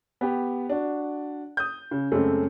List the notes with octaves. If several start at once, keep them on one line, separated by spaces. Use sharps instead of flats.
B3 G4
D4 F#4
D#6 G6
C#3
F#2 C#3 G#3 A3 C4 C#4